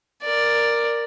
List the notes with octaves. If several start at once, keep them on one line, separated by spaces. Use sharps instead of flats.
A#4 D5